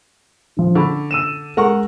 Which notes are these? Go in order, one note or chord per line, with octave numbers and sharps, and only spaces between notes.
D3 F3
D3 B5 C#6
E6 D#7 E7
G#3 A#4 F#5 C#6